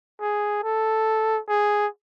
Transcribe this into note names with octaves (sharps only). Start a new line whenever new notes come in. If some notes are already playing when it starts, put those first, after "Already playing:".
G#4
A4
G#4